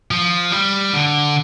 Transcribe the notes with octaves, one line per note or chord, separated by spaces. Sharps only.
F3
G3
D3